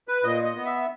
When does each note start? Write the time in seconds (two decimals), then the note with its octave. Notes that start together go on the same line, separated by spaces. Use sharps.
0.08 B4
0.23 A#2 D#5
0.44 D#5
0.56 B3
0.65 E5